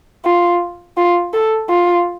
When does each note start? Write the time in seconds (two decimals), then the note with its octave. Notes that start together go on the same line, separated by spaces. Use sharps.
0.25 F4
0.97 F4
1.33 A4
1.69 F4